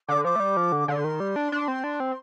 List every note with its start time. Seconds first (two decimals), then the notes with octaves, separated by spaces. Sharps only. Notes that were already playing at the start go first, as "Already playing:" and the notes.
0.08 D3 D6
0.25 F3 D6
0.36 A3
0.40 G3
0.57 F3
0.72 D3
0.88 D3 C6
1.04 D#3
1.20 G3
1.36 D4
1.52 D4
1.68 C4
1.84 D4
2.00 C4